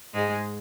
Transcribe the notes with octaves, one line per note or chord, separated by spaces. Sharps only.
G#2 G#3